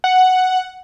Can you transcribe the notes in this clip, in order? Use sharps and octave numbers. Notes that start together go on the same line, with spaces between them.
F#5